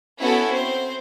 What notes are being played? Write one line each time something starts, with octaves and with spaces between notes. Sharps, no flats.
B3 C#4 E4 F#4 A4 F#5
C4 C5